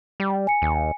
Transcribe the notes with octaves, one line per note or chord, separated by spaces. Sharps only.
G3
G#5 C#7
D#2